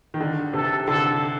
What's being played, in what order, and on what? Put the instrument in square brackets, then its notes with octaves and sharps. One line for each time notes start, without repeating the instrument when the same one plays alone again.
[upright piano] D#3
D3
[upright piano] C3 [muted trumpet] A4
[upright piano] D3 [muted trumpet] A4